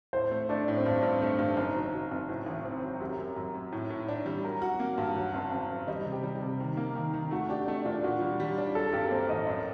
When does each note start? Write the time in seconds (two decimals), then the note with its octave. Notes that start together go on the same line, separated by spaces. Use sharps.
0.13 A2 C5
0.31 A3
0.49 A3 D4
0.68 A2
0.77 C4
0.86 G2 D4
1.03 G2
1.22 A3 D4
1.39 G2
1.57 F#1 D#4
1.75 F#3
1.93 F#3
2.12 F#1
2.29 A2
2.46 A1
2.65 C4
2.83 F#3
3.00 F#2 G4
3.19 F#2
3.36 F#2
3.54 F#2
3.72 A2
3.90 A2
4.08 D4
4.26 G3
4.44 F#3 A#4
4.62 F#4
4.80 A#3
4.98 G2
5.16 F#3 F#5
5.34 F#1
5.52 F#1
5.70 F#1
5.87 G3 D#5
6.05 C3
6.12 G4
6.23 G3
6.36 G4
6.42 C3
6.60 D#3
6.77 A#3
6.95 D#3
7.14 D#3
7.31 A3 F#4
7.49 D4 G4
7.67 A3 D4
7.85 A#2 D4
8.04 A#2 F#4
8.21 G3
8.40 G3
8.58 D4
8.75 F#3 A4
8.93 G2 G4
9.04 A#4
9.11 A#3 C5
9.29 A1 D#5
9.47 F#2 D#5